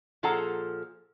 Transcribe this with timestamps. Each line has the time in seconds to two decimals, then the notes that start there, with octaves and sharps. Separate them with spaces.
0.23 A#2 F3 G#4 A4 F#5 A#5